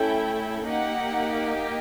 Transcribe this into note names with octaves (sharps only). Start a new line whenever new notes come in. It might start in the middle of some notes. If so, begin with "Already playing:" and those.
Already playing: A3 C#4 E4 A4 G5
A#3 D#4 G4 F#5